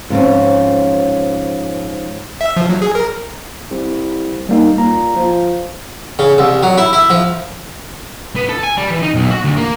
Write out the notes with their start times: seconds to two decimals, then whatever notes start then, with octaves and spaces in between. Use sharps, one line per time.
0.10 G#2 F3 C4 C#4
2.41 E5
2.57 F3
2.69 F#3
2.82 G#4
2.95 A#4
3.71 C2
4.49 G3 A#3 D#4
4.78 A#2 A#5
5.16 F3
6.19 C#3
6.38 C2
6.63 F#3
6.78 E4
6.93 E4
7.10 F3
8.35 B3
8.49 A4
8.63 G#5
8.77 G3
8.90 E3
9.02 D#4
9.15 B1
9.30 F#4
9.44 D2
9.57 A#3